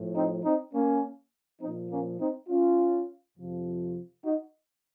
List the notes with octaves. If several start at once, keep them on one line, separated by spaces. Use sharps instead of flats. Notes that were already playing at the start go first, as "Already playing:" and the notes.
Already playing: A2 F3
C4 D#4
C4 D#4
A#3 C#4
F3 C4 D#4
A#2
A#3 C#4
C4 D#4
C#4 F4
F2 C3 F3
D#4 F#4